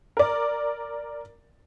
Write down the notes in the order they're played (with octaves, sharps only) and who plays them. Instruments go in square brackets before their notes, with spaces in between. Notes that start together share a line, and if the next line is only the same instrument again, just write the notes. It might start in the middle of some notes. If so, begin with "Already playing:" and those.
[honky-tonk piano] A#4 D5